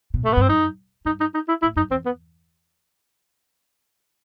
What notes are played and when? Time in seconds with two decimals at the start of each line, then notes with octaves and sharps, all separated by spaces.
0.14 B2
0.24 A2 A3
0.33 B3
0.37 G2 C4
0.49 F#2 D#4
1.05 G2 D#4
1.20 D#4
1.34 D#4
1.48 E4
1.62 A2 E4
1.76 F#2 D#4
1.90 E2 C4
2.05 B3